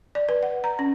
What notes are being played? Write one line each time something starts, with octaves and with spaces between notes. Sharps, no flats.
D5
B4
F#5
A#5
C#4